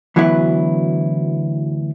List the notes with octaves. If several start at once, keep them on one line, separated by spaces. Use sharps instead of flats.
D2 E3 F#3 B3 E4